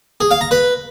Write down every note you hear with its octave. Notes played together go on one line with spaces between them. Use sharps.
G#4
F5
A#5
B4